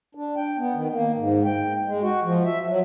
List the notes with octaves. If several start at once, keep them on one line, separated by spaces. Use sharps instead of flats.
D4
G5
B3
D#3
A#3
G#2
G5
G#3
F#4
F3
E5
F#3